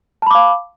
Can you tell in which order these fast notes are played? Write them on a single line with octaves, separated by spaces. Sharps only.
A5 B5 D6 F5